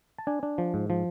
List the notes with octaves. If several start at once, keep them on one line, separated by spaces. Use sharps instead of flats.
A5
D4 G#5
D4
F3
G#2
F3